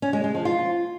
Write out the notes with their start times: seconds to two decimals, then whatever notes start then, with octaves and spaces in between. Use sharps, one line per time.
0.02 C#4
0.13 G#3
0.24 G#3
0.35 F3
0.45 F4